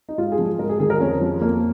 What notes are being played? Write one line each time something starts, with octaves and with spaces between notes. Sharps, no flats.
D#4
G#2 F4
G#4
F3
G#2 A#4
G#4
D#3 G#4
A#4
F2 C#4
F3
F2 A#3